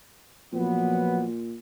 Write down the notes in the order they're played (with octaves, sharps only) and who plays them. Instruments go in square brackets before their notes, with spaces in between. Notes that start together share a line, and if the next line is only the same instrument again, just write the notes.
[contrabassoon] A#2 [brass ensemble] F3 F#3 B3